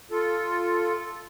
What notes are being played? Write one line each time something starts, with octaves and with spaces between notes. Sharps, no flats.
F4 A4